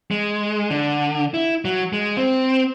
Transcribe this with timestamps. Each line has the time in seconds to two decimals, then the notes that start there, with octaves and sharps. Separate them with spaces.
0.11 G#3
0.70 D3
1.34 E4
1.65 F#3
1.93 G#3
2.17 C4